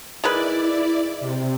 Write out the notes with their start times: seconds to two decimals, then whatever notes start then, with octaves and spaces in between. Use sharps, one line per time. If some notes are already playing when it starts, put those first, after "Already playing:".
0.24 D#3 G#3 E4 B4 D5
1.20 C3